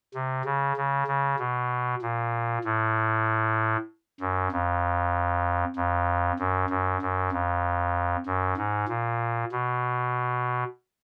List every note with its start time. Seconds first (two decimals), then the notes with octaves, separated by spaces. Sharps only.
0.14 C3
0.45 C#3
0.77 C#3
1.08 C#3
1.39 B2
2.02 A#2
2.64 A2
4.20 F#2
4.52 F2
5.76 F2
6.39 F#2
6.69 F#2
7.02 F#2
7.32 F2
8.26 F#2
8.57 G#2
8.88 A#2
9.52 B2